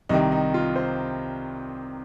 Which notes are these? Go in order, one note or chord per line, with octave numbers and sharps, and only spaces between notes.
C2 C3 D#3 D#4
D#4
F4
C5